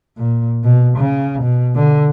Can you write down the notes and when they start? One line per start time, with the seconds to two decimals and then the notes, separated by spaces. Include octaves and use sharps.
0.17 A#2
0.64 B2
0.98 C#3
1.43 B2
1.76 D3